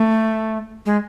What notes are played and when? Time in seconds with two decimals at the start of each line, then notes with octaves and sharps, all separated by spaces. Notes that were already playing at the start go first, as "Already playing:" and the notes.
Already playing: A3
0.86 G#3